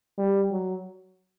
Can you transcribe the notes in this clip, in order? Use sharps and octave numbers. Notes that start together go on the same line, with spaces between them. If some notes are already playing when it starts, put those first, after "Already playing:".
G3
F#3